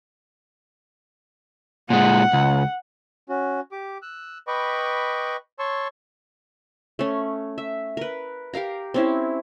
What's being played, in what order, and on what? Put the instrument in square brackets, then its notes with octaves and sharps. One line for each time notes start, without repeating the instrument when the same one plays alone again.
[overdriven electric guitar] A#2 G#3 [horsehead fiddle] F#5
[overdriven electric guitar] C#2
[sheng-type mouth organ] C#4 F#4
G4 D6
E6 F#6
B4 D#5 G5 B5 C#6 D6
C#5 A5 C6 C#6 E6
[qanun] A3 C#4
E5
A#4 B4
G4 A#4 F5 A#5
C4 C#4 E4